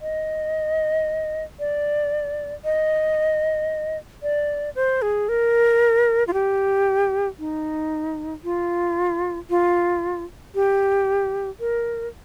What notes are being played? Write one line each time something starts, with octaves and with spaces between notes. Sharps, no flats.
D#5
D5
D#5
D5
C5
G#4
A#4
F4
G4
D#4
F4
F4
G4
A#4